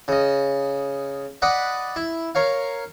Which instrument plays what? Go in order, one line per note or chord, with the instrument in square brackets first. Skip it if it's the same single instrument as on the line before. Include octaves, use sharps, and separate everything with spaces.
[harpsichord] C#3 D#5
B4 D5 D#5 F#5 B5 D#6
E4
A#4 C#5 F5